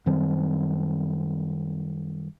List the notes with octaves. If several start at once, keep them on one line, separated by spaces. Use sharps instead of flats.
F#2 D#3 G3 C4